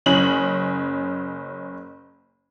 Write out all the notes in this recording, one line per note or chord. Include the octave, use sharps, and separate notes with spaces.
F#1 C#4 F#7